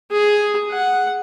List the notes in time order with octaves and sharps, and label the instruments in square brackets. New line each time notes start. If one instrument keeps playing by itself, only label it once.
[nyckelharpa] G#4
F#5